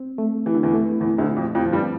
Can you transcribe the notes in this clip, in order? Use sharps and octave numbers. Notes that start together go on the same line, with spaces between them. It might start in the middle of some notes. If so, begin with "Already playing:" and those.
Already playing: C4
A3
E3 G4
D3
E2 E3
A3
E2 A#2 E3
D2 D3
A#2
F2 F3
F2 F3 G4
F3
G2 G3
C4